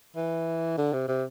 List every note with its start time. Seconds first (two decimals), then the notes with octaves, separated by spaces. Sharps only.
0.16 E3
0.78 D3
0.93 C3
1.08 C3